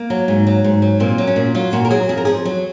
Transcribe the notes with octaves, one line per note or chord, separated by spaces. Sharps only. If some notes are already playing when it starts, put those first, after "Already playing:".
Already playing: A#3
F#3
G#2
F#3
G#2
F#3
A#2 C4
F#3
C#4
A#2
F#3 F4
A#2 F#4
A#4
F#3 G#4
F2 G#4
A#4
F2 G#4
F#3